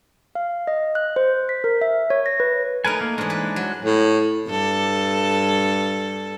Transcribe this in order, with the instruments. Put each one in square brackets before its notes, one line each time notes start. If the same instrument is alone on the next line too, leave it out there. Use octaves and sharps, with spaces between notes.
[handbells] F5
D#5
F#6
C5
B6
A#4
E5
C#5
A#6
B4
[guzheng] A3 D#4 [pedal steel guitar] A#4 B4 G#5
[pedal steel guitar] A#3
[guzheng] G#2 E3 [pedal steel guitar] G#3 D4 G#4
[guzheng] B4
F#3
[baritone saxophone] A2
[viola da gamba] G2 A4